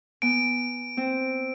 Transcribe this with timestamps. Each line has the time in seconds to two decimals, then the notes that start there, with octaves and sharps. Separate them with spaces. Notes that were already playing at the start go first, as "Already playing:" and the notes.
0.22 B3 G#5 D7
0.97 C4